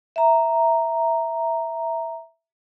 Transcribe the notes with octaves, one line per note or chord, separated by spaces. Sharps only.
E5 A#5